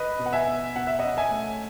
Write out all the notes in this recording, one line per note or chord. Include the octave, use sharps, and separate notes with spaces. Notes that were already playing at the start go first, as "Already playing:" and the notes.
Already playing: B4 D#5
B2
F#5
E5 G#5
B3
B2 F#5
E5
C#4 D#5 F#5
E5 G#5
A3